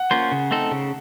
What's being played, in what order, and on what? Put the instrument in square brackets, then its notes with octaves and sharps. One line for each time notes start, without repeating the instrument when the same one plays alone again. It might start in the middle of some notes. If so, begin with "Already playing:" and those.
Already playing: [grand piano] F#5
[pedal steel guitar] A#3 C#4 F4 C5
C#3
A3 C4 D#4 A4
C#3